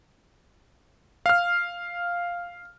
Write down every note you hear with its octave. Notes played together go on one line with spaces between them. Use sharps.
F5 F6